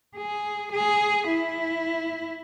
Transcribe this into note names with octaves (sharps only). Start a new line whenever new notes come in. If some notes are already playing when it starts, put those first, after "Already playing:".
G#4
G#4
E4